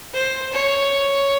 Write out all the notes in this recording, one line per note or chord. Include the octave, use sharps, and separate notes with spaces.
C5
C#5